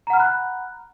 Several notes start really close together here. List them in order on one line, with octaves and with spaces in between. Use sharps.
A#5 F#5 F6 B5 F#6